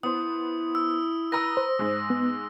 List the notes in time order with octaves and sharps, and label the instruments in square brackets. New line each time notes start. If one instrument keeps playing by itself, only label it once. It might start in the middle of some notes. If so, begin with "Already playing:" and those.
[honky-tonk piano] B3 C5 [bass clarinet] E4 [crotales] D#6
[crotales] E6
[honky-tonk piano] B4 A#5 D#6 [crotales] E6 A#6
[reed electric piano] C5
[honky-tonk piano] G#2 G#3
[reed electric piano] B3